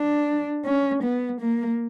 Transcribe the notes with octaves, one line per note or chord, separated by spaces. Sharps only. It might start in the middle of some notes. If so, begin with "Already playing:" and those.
Already playing: D4
C#4
B3
A#3